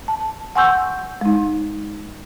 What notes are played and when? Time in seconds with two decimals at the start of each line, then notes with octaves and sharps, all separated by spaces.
0.08 A5
0.56 F#5 G#5 C6 C#6 E6 G6
1.21 G#3 D#4